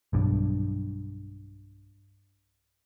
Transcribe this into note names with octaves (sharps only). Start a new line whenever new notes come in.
B1 G2